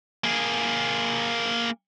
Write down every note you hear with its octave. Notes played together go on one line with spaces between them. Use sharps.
A#3 G#4